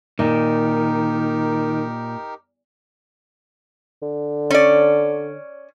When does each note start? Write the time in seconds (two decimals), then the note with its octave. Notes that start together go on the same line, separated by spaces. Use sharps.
0.19 A#2 D#3 D#4 G4 A#4
4.02 D3
4.50 C#4 D5